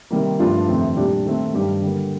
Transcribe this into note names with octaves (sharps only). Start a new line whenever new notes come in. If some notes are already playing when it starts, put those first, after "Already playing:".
C3 D#3 G3 A#3
G2 F3 A3 D4 F4
F2 C3 D#3 A3 C4
A#2 G3 D4 G4
D#3 A3 C4
G2 D#3 G3 D4 G4
D3 G3 A#3